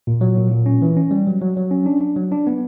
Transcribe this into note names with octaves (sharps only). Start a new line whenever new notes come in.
A#2
F#3
A#2
A#2
C#4
E3
C#4
G3
F#3
F#3
F#3
C#4
D4
D4
F#3
D4
B3